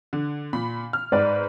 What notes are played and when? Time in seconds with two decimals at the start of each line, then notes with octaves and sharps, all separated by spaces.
0.13 D3
0.53 A#2 B5
0.93 F6
1.12 G#2 B4 D5